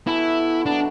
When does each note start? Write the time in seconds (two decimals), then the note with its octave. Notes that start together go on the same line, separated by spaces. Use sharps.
0.06 E3 B3 E4 F#4 A4
0.66 B2 F#3 B3 D4 F#4